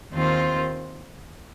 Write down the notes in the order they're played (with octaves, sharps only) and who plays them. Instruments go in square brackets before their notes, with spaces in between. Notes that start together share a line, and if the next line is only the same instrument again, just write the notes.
[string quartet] D#2 D#3 C4 F4 C5